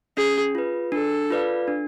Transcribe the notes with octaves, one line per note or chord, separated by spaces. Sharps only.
C#4 G#4
F4 B4
D4 A4
F4 B4 D5 F5
D4